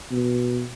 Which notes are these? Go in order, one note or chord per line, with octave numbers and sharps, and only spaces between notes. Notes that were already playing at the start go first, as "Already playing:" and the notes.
B2